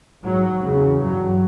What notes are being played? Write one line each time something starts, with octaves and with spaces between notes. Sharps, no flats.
G#2 F#3
E2 C#3
G2 F#3